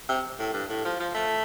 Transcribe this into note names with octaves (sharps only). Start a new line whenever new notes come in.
C3
A2
G2
A2
F3
F3
A3